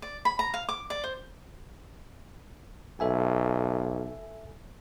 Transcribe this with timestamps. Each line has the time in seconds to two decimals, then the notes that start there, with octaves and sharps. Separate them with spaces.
0.02 D5
0.25 B5
0.39 A#5
0.54 F5
0.69 D6
0.90 D5
1.04 C5
3.00 B1 A4 E5 G#5